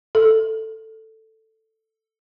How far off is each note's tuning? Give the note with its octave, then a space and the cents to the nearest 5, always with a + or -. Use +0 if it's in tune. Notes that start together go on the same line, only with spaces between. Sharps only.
A4 +5